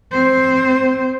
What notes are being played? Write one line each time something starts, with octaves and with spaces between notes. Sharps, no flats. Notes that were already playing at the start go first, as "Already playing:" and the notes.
C4 C5